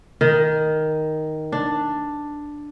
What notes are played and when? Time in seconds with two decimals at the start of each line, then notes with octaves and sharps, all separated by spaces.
0.21 D#3
1.52 D4